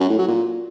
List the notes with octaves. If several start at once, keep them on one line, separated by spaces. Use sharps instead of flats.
F#2
A2
F#3
A#2